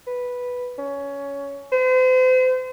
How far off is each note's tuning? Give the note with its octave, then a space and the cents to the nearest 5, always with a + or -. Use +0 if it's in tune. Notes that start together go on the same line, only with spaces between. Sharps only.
B4 -5
C#4 +15
C5 -40